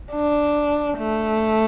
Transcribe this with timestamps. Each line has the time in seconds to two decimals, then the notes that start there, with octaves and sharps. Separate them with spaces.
0.12 D4
0.99 A3